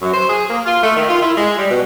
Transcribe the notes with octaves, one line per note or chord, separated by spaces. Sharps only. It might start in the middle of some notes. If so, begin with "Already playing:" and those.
F#2
C5
G#4
A#3
F4
A3
D#3
F4
E4
G#3
G3
B2